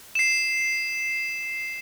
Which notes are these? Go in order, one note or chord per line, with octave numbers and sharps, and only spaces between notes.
C7 E7